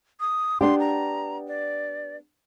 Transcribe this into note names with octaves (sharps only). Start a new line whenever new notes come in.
D#6
B3 D4 G4 C6
A#5
D5